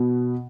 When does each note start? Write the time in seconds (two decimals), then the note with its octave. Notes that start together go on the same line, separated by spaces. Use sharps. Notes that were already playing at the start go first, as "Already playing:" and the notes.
Already playing: B2